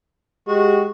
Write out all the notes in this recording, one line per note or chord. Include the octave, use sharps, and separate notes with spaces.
G#3 F#4 G4